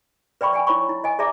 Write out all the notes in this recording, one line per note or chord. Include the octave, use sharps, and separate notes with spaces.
B4 D5 G5 B5 C#6
D5 G5 G#5
E4 C#5 B5 C#6
E4
D#5 G#5
G#4 D5 E5 A5 A#5 D6